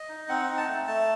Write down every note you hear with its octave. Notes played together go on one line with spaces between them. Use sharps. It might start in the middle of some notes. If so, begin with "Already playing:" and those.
Already playing: D#5
D#4
C4 F#5
D#4
A5
A3
A3 A5